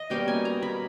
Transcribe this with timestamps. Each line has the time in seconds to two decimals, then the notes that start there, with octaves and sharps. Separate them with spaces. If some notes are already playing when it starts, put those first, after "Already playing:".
Already playing: D#5
0.10 B2 G3 A#3 C#4 G5
0.28 G#5
0.45 A#5
0.62 B5